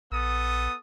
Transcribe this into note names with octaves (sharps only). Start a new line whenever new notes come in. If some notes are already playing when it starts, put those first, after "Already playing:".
A#1 B3 A4 D#6